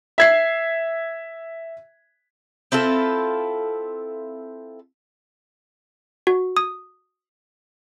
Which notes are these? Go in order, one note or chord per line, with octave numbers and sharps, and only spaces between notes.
E5 G#6 C7
C4 E4 F4 A4
F#4
D#6